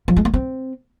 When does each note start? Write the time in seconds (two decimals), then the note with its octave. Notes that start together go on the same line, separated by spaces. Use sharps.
0.08 F3
0.17 G#3
0.25 A#3
0.34 C4